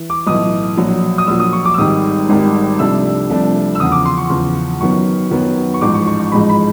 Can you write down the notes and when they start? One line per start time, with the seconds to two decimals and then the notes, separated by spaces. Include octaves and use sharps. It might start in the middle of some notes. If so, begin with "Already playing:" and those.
Already playing: E3
0.10 D6
0.27 B1 A2 E3 D#6
0.77 A#1 A#2 F#3
1.18 D#6
1.27 A#1 A#2 F#3 E6
1.40 D#6
1.53 C#6
1.65 D6
1.74 E6
1.78 G#1 G#2 D#3 G3 D#6
2.29 G#1 G#2 D#3 G3
2.79 C2 C3 F3 A3 D4 E6
3.30 C2 C3 F3 A3 D4
3.75 E6
3.80 E2 C#3 F3 D#6
3.92 D6
4.05 C6
4.18 C#6
4.30 E2 C#3 F3
4.81 F#2 D#3 F#3 B3 C#6
5.31 F#2 D#3 F#3 B3
5.74 C#6
5.81 A1 G#2 F3 G#3 D6
5.94 C#6
6.07 C#6
6.20 C#6
6.32 A1 G#2 F3 G#3 B5
6.49 B5